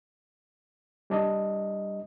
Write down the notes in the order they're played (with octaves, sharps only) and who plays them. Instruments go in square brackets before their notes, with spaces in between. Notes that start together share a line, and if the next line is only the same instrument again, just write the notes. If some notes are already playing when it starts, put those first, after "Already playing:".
[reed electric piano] G3 D4 D#5